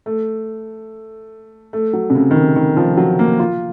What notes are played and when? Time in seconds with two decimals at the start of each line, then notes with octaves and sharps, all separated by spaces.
0.06 A3
1.73 A3
1.93 F#3
2.10 C3
2.15 C#3
2.31 D#3
2.35 C#3
2.56 D#3
2.77 F3
2.97 F#3
3.19 A#3
3.40 F4